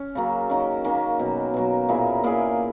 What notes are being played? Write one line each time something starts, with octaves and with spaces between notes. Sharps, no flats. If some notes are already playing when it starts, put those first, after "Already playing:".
Already playing: C#4
C#3 F#3 A#3
D#3 A#3 C#4
D#3 A#3 C#4
B2 F#3 A#3
B2 F#3 A#3
A#2 A#3 E4 G#4
A#2 A#3 E4 G#4